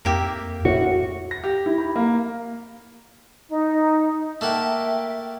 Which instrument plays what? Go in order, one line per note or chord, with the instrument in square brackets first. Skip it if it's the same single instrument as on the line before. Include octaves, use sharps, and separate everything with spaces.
[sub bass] F2 [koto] A#3 G4 E5
[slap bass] A2 [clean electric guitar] F#4
[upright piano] A#6
G4
E4
B5
A#3
[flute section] D#4
[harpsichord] A3 A#3 F#5 [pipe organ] E5 G5